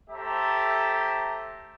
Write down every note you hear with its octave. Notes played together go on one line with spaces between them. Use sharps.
A3 G4 C5 E5 A5 A#5